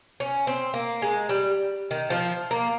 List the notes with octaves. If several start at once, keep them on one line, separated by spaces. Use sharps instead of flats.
C#4
C4
A#3
G#3
G3
D#3
F3
A#3